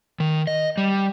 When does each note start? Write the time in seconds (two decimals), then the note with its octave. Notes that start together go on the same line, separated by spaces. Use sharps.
0.20 D#3
0.47 D#5
0.78 G3